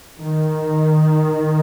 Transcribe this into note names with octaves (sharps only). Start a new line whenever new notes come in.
D#3